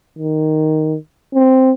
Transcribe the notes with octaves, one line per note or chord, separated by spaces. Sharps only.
D#3
C4